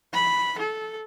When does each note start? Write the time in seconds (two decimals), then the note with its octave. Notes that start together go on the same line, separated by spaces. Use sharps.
0.13 B5
0.59 A4